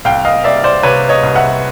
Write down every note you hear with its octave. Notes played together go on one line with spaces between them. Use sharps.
C2 F5 G5
D#5 F5
C2 D5 E5
C5 D5
C3 B4 C#5
C#5 D#5
C2
E5 F#5